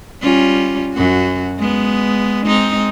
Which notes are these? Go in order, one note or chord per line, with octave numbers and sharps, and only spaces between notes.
G3 C#4 F4
F#2 F#4
G#3 B3
G#3 C4 D#4